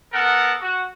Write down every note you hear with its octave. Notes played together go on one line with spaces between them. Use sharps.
B3 A4 A#4 F#5
F#4